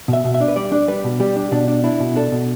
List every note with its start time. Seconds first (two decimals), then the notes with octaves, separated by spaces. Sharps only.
0.08 B2 E5
0.24 B2
0.34 E5
0.40 D4
0.48 B4
0.56 G3 D5
0.72 D4
0.88 G3 B4
1.04 B2
1.20 G3 G4
1.36 D4
1.52 B2 D4
1.68 D4
1.84 D4 E4
2.00 B2
2.16 D4 A4
2.32 B2